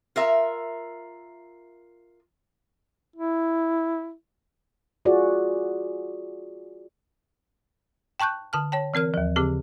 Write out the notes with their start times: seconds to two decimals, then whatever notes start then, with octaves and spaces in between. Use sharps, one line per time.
0.16 F4 A#4 E5
3.16 E4
5.05 F4 F#4 G#4 D5
8.20 G5 A5 C#6 F#6 G6
8.53 D3 A5 F6
8.72 C#5 G5 A5
8.94 E3 C4 A#4 F6
9.14 D#2 F3
9.36 C#3 C4 G4 G#4